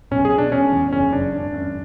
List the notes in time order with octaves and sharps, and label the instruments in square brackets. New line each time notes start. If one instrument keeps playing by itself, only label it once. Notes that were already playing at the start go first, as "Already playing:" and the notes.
[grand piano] B1 [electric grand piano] C#4
[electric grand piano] G#4
[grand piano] B2
[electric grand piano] D4
[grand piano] E1 [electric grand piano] C#4
[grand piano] E2
[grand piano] F#1 [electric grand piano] C#4
[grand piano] F#2 [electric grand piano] D4
[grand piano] G#1
F#2